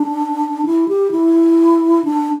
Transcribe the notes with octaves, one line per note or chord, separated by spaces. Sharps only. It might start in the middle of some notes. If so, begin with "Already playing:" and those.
Already playing: D4
E4
G4
E4
D4